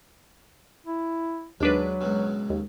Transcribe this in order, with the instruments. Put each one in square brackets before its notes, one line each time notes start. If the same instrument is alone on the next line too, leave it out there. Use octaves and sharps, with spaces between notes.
[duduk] E4
[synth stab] D#2 D4 B4 [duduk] F#3 [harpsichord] G#3
[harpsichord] C#2 F#2 B2
[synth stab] D#2